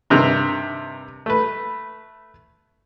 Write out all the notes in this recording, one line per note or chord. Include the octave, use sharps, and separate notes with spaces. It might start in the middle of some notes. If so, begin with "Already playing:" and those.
G2 C3 D#3
A3 B4